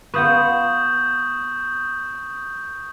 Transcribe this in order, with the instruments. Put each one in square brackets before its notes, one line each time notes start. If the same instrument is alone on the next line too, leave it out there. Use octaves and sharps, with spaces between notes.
[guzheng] B3 F4 B4 [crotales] C#6 D#6 G6